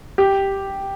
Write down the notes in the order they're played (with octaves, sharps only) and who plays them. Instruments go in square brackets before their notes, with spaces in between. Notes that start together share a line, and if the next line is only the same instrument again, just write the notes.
[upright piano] G4